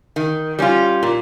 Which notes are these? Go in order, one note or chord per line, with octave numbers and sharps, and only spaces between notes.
D#3
G3 C#4 F4
A#2